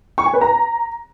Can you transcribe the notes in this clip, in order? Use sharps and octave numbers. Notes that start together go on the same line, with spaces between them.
C#6
G#5
B4
A#5